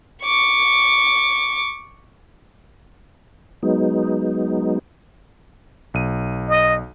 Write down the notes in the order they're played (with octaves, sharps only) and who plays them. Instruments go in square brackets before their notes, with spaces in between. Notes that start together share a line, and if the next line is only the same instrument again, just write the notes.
[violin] C#6 D6
[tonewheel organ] F#3 G#3 B3 D#4
[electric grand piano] B1 D#7
[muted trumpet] D#5